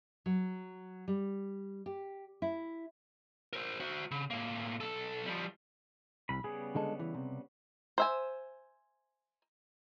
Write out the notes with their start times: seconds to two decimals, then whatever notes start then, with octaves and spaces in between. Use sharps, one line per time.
0.26 F#3
1.08 G3
1.86 G4
2.42 E4
3.53 A#4 C5
3.80 F#4 C5
4.11 C#3
4.30 A2 A#3
4.80 B1 A4
5.26 F3 G3
6.29 C2 B5
6.44 C#3 G3 B3 G#4
6.75 D3 G#3 A4
6.99 E3
7.14 C3
7.98 C5 E5 G#5